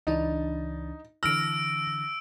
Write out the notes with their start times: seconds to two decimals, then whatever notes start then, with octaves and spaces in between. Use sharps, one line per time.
0.07 C#2 E3 D4 D#4
1.23 D3 E3 E6 F6 A#6 D7